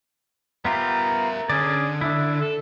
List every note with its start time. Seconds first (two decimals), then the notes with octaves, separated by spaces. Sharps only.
0.65 B3 F4 G4 A#4 E5 A#5
1.50 D3 C#4 G#4 D5
2.01 D4 E4 E5
2.41 A4